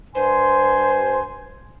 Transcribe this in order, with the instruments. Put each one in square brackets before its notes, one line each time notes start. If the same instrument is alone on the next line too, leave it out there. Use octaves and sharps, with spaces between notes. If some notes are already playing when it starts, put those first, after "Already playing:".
[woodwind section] G2 G#5 C6 [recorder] C5